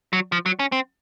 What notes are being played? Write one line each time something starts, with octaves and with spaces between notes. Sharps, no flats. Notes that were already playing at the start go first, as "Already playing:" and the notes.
F#3
F3
F#3
C#4
C4